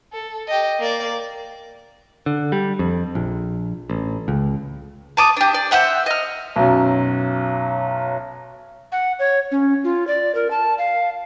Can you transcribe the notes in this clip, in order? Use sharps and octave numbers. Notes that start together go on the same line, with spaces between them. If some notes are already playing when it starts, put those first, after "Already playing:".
A4
G4 D#5
A#3 D5
D3
G3
F2
A#1
A1
C#2
A5 D6 D#6
D4 G4
D5
C5 E5 F#5 G5
D#5 F6
B1 F#2
F#5
C#5
C#4
F4
D5
A#4
A5
F5